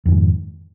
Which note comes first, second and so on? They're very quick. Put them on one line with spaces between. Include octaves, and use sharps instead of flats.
F2 D#3 G#2